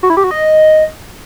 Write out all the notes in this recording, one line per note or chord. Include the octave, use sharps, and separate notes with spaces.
F#4
E4
G4
F#4
D#5